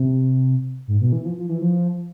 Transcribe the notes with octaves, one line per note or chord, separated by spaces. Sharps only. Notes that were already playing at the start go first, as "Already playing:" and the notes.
Already playing: C3
G#2
B2
E3
F3
F3
E3
F3